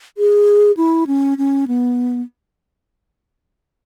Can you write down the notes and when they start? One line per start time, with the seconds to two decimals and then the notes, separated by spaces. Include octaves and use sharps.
0.18 G#4
0.77 E4
1.07 C#4
1.38 C#4
1.68 B3